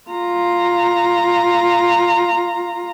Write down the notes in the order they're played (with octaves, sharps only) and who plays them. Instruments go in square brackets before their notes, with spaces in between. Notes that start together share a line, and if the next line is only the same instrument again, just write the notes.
[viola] F4 A#5